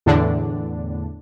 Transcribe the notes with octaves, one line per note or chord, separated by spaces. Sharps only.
E2 A2 D3 D4